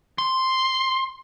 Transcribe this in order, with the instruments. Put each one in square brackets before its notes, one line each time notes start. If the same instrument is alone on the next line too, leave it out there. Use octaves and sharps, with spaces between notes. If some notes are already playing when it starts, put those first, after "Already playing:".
[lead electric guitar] C6